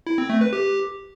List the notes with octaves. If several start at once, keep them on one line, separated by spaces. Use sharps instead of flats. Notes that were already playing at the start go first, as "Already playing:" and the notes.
E4
C4
A3
B4
G4